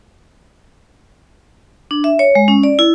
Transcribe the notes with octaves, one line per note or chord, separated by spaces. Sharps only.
D4
E5
C#5
G#3
C#4
D5
E4